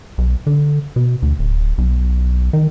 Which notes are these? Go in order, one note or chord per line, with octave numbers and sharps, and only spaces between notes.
B1
D3
B2
D2
D1
B1
D#3